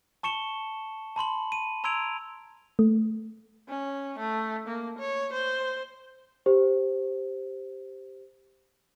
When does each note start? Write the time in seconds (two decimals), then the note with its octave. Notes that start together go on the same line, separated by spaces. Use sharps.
0.23 A5 C#6 C#7 E7 G7
1.16 A5 B5 C6 F#7
1.52 D#7
1.84 A#5 C6 E6 G#6 D7 F7
2.79 A3
3.69 C#4
4.19 A3
4.68 A#3
4.99 C#5
5.33 C5
6.46 G4 C5